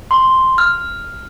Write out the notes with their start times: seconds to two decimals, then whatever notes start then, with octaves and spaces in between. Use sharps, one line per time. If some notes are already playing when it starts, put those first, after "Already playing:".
0.11 C6
0.58 F6